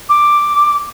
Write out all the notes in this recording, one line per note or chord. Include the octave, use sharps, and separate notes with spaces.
D6